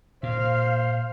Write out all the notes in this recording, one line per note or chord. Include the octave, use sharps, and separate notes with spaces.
A#2 C5 F5